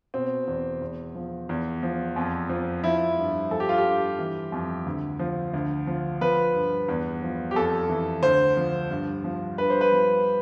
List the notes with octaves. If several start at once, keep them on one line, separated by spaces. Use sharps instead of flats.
B2 C4
E2
E2
F3
E2
F3
F2
F3
F3 E4
G2
F3 A4
G4
F4
G4
G2
E3
F2
D2
F3
D2
F3
F3 B4
G2
E2
F3
G4
F2 A4
E3
D2 C5
F3
G2
F3
G2 B4
C5
B4
F3